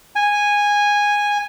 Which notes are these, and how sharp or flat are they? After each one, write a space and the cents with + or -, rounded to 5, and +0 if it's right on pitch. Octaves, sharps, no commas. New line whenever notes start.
G#5 -10